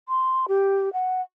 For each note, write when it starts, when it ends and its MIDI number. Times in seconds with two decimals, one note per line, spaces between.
0.09 0.46 84
0.48 0.92 67
0.93 1.21 78